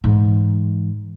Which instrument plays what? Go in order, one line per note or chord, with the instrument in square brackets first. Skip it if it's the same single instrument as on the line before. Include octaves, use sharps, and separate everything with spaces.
[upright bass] G#2 E3